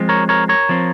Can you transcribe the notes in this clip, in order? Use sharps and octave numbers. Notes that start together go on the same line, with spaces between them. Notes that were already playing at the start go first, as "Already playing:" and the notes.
Already playing: F3 G#3 C4
A#4 C#5
A#4 C#5
A#4 C#5
F3 C4